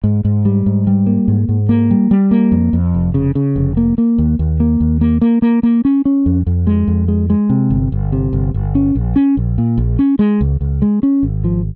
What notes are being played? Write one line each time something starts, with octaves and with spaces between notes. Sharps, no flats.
G#2
G#2
G3
G#2
G3
A#3
G#2
G#2
A#3
G3
G3
A#3
F2
F2
F1
C#3
C#3
F1
A#3
A#3
D#2
D#2
A#3
D#2
A#3
A#3
A#3
A#3
C#4
C#4
F2
F2
G#3
F2
G#3
G#3
C3
G1
G1
C3
G1
G1
C#4
A#1
C#4
A#1
A#2
A#1
C#4
G#3
C#2
C#2
G#3
C#4
G#1
F3